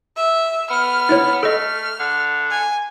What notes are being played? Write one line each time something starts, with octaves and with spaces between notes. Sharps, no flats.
E5
B3 F6
D#4 E4 C#5
A3 A4 D#5 F6
D3
G#5